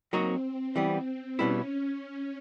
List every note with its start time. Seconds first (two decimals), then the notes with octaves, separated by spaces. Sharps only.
0.13 F#3 A#3 C4 D#4 F#4
0.76 E3 G3 B3 C4
1.07 C4
1.38 B2 G3 B3 C#4 E4